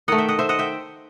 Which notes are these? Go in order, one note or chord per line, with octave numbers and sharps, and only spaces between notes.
D#3 A3 D#5 F#5
E5 G5
D#5 F#5
C5 E5
D#5 F#5
E5 G5